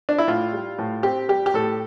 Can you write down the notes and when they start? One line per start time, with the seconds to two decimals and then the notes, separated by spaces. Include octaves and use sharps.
0.09 D4
0.18 E4
0.27 A2 F4
0.53 G3
0.78 A2
1.03 C4 G4
1.29 G3 G4
1.46 G4
1.54 A2 A4